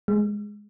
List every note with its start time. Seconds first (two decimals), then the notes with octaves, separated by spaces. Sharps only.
0.08 G#3